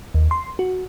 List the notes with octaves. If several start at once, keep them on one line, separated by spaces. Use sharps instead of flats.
D#2
C6
F#4